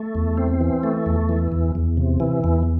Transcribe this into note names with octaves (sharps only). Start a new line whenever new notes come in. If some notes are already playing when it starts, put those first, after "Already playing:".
Already playing: A3
E2
C4
E3
A3
E2
E3
E2
E2
C3
E3
E2